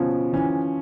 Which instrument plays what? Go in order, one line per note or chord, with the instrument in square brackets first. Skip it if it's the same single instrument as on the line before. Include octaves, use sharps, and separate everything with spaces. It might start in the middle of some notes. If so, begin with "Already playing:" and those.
Already playing: [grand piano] B2 C#4 [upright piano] F3
[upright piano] E3 [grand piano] C#4